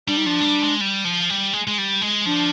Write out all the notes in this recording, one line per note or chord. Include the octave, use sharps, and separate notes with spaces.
G3 D4
D#4
F3 D4
G#3
G3
G#3
G3
F3
G3
G#3
G#3
G3
G#3
F3 D4